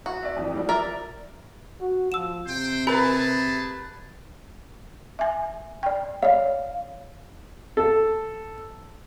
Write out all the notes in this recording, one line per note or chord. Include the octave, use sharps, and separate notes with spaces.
F#4
D5 E5
F2 E3 D4
F3 G3 D4
A#4 D5 E5
F#4
F3 E6 E7
C3 C5 G5
A3 G#4 A#4 B4 G#5 A5
E5 G#5
D5 G5
C#5 D5 F5
A4